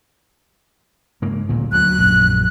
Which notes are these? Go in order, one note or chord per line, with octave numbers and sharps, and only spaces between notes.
G#2 C#3 A#3
D1 A#2
D2 F#3 F#6
A#1 F#2